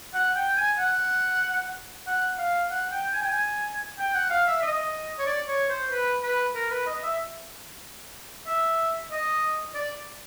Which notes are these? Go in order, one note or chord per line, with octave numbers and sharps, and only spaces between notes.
F#5
G5
G#5
F#5
F#5
F5
F#5
G5
G#5
G5
G#5
G5
F#5
F5
E5
D#5
C#5
D5
C#5
C5
B4
B4
A#4
B4
D#5
E5
E5
D#5
D5